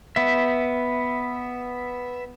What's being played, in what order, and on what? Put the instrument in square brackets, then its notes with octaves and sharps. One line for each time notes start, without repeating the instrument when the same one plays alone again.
[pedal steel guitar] B3 E5